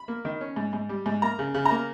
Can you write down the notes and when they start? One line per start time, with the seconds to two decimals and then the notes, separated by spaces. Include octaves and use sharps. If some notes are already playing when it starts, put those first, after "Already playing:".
Already playing: B5
0.08 A#3
0.25 D#3
0.41 C#4
0.56 G#2
0.73 G#2
0.89 G3
1.06 G#2
1.22 A#3 A#5
1.39 C#3
1.54 C#3
1.65 A#5
1.71 A#3